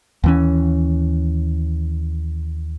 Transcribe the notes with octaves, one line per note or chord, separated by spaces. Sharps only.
D#2 E3 C#4